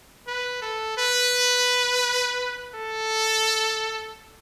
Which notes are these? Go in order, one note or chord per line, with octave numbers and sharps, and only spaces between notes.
B4
A4
B4
A4